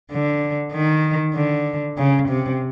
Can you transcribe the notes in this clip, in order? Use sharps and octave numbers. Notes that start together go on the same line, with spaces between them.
D3
D#3
D3
C#3
C3